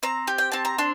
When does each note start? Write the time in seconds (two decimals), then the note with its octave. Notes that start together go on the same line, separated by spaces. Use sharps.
0.03 C4 A#5
0.27 G4
0.38 G5
0.52 C4 A5
0.65 A#5
0.78 D4 C6